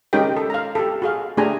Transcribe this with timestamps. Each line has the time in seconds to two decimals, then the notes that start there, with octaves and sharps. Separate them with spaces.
0.13 G#3 C#4 D#4 G4 A#4 G5
0.37 A4
0.50 F5 A#5
0.75 G4 A4
1.02 F#4 G#4 F5
1.37 A3 D4 G4 G#4 G#5 A#5